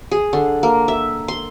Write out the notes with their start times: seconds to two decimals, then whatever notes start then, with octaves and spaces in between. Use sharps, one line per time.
0.11 G#4
0.33 D3
0.63 A#3
0.88 E5
1.28 C6